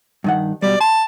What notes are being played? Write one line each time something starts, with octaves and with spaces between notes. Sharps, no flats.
G2 D#3 F#5
B2 G3 D5
A5 C6